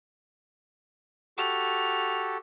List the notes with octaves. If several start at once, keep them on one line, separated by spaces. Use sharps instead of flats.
F#4 G4 A4 F6